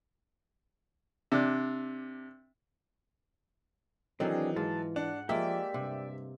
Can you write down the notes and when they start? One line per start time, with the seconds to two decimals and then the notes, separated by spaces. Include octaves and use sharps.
1.32 C3 D4
4.20 D#3 E3 F#3 C4 D4 G#4 A4
4.56 G#2 F4 A5
4.96 D4 F#5
5.29 F3 G#3 A#3 G4 D5 E5
5.74 G2 C3